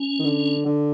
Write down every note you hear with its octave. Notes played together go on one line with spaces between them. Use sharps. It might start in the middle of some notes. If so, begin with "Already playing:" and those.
Already playing: C#4
D#3
D3
D3